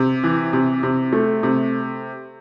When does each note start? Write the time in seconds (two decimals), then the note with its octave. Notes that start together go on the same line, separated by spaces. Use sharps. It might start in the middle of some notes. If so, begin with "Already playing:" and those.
Already playing: C3
0.24 E3
0.53 C3
0.83 C3
1.13 A3
1.43 C3